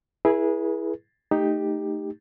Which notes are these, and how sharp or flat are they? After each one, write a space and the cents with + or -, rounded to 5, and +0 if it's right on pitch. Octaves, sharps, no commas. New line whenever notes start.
E4 +0 G#4 +0 B4 -40
A3 +0 D#4 +0 G4 +10